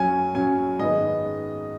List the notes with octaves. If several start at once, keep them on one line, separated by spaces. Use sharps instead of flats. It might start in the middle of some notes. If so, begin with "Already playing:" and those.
Already playing: F#2 F#3 C#4 G#5
F#2 F#3 C#4 G#5
G#2 D#3 G#3 B3 D#5